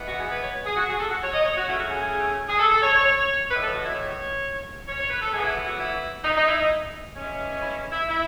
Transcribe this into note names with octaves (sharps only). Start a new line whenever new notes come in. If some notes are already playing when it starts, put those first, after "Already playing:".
Already playing: E3 G#3 B3
F#4
G#4
B4
C#5
G#4
F#4
G#4
A4
F#4
C#5
D#5
C#5
F#4
C#3 F#3 A3 C#4 E4
F#4
G#4
G#4
G#4
A4
A4
C#5
C#5
C#5
A2 E3 G#3 B4
A4
F#4
E4
C#5
C#5
C#5
B4
A4
A2 E3 B3 G#4
E4
F#4
F#4
E4
D#4
D#4
E4
D#4
E3 G#3 C#4
E4
E4
E4